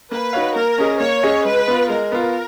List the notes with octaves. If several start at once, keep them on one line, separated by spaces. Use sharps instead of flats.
A#3 B4
D#4 F#4 C#5 F5
A#3 A#4
C#4 G#4 D#5
A#3 C#5
C#4 G#4 D#5
G#3 B4
B3 F4
G#3 A#4
B3 F4